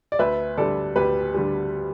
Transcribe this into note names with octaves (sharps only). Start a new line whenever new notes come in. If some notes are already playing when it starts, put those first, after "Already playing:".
D5
D2 B4 E5
D3 G3 A4 D5
D2 G4 B4
D3 G3